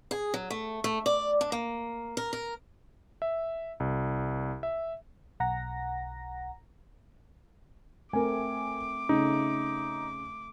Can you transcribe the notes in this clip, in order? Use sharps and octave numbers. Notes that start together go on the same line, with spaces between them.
G#4
F#3
A3
A3
D5
D4
A#3
A#4
A#4
E5
C2
E5
B1 F#5 A#5 A#6
A3 C4 A#4 G#5 D6
C#3 A3 D#4